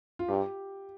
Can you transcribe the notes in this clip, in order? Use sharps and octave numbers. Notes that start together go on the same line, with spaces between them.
F4
G2 G4